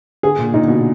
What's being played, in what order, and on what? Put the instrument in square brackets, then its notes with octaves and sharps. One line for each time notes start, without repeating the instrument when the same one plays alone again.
[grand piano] D3 [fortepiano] G#4
[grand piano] A#2
[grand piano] A#2 [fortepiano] D#4
[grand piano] D3
B2